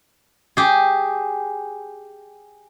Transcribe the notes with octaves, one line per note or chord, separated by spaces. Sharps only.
G4 G#4